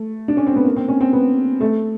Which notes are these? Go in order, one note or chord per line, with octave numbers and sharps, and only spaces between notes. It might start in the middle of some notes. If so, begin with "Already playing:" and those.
Already playing: A3
D4
C#4
C4
B3
A#3
C4
C#4
C4
B3
A3